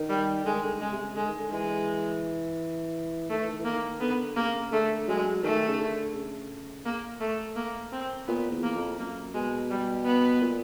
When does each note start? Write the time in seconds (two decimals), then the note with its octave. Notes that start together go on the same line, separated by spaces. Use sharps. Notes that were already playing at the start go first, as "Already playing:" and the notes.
Already playing: D#3
0.09 G3
0.45 D3 G#3
0.54 D#3
0.63 D3
0.81 C#3 G#3
0.92 C3
1.02 C#3
1.16 D3 G#3
1.28 D#3
1.39 D3
1.51 E3 G#3
3.30 D#3 A3
3.40 E3
3.52 D#3
3.59 E3
3.65 D#3 A#3
4.00 D3 B3
4.36 C#3 A#3
4.72 D3 A3
5.08 F#3 G#3
5.43 D#3 A3
5.68 C#3
5.79 D3
6.14 C#3
6.85 A#3
7.21 A3
7.56 A#3
7.92 C4
8.27 A#2 B3
8.51 E2
8.63 A#3
8.75 F2
8.99 F#2 A#3
9.34 B2 G#3
9.71 G3
10.05 B3
10.41 A#2